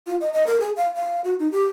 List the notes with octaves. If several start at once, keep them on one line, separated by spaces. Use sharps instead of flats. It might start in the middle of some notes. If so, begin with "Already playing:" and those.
F4
D#5
D#5
A#4
G#4
F5
F5
F#4
D#4
G4